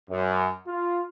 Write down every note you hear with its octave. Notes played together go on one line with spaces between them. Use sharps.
F#2
F4